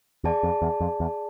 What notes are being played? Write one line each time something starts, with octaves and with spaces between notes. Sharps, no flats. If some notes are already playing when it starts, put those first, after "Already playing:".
E2 G#4 D5 A5
F2
E2
F2
E2